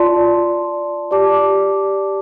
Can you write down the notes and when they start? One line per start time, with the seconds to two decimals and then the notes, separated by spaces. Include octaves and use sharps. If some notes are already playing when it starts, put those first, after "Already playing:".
Already playing: F4 D5 A5 C6
1.11 G4 D5 A5 D6